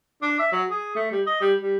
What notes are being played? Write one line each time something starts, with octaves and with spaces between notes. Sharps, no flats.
D4
E5
F#3
G#4
A3
G3
D#5
G3
G3